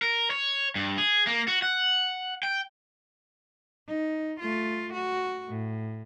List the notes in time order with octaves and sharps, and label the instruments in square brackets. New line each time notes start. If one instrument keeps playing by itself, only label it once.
[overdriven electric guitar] A#4
C#5
G2
G#4
A#3
F#4
F#5
G5
[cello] D#4
A3 F4
F#4
A2